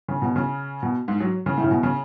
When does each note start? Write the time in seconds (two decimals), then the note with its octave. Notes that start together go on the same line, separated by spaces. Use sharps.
0.09 C#3
0.22 B2
0.36 C#3
0.83 B2
1.08 G#2
1.20 F#3
1.46 C#3
1.58 A2
1.64 C#3
1.71 B2
1.83 C#3